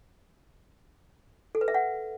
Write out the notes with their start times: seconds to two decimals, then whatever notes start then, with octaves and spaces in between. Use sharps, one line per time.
1.55 A4
1.61 B4
1.68 E5
1.74 F#5